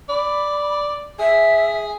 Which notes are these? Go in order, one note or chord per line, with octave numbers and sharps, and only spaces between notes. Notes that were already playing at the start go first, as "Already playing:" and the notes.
D5 B5
G#4 E5